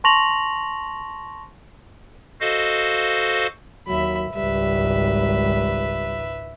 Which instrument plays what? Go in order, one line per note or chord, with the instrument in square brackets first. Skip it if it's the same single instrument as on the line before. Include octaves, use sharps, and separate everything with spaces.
[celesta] A5 C6 C#6 A#6 F7 F#7
[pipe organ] F#4 A4 C5 D#5 F5
[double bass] D#2 [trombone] F#3 [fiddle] E5 B5
[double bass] G#1 C#2 [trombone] G3 [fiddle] B4 E5